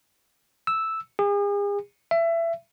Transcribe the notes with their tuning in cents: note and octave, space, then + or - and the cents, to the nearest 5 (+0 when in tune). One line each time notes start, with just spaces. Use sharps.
E6 -5
G#4 -40
E5 +25